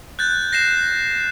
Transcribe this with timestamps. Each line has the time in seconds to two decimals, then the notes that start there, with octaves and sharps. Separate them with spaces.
0.19 F#6 G6 A6
0.53 A#6 C7 E7